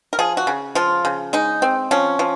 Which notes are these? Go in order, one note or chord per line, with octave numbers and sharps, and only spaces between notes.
A#4
F3 G#4
F#4
C#3
F3 F4
C#3
G#3 D#4
C4
F3 C#4
F3